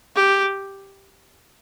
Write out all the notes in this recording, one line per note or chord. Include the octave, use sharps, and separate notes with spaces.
G4